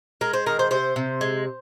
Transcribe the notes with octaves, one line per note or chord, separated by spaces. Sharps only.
G#3 A#4
C5
D#3 A#4
C5
C3 C5
C3
G#3